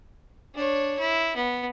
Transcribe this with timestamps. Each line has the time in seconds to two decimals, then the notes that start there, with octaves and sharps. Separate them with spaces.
0.55 D4 C#5
0.99 E4
1.36 B3